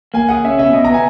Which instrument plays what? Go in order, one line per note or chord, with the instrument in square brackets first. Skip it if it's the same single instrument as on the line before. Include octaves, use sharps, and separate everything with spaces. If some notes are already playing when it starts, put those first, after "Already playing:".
[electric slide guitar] A#3 [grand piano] G#5
[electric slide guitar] G#4 [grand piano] F#5
[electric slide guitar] C#4 [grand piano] E5
[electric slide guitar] B2 [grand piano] E5
[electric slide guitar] B2 [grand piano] D#5
[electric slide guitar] B3 [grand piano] A#5
[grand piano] G#5